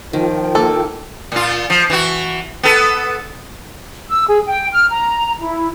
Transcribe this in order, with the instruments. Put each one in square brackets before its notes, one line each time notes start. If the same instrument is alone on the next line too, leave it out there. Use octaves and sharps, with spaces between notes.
[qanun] D#3 [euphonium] F3 [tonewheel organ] F4 A#4 G5
[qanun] A#3 [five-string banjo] A4
[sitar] A#2 F4
F3
E3 F#4
B3 A4
[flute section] E6
G#4
G5
F6
A#5
E4